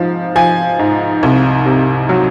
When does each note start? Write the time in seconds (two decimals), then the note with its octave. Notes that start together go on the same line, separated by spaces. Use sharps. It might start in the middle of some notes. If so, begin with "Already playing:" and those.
Already playing: G#2 F3
0.36 F3 G#5
0.79 G#2
1.23 C2
1.66 C3
2.09 F#3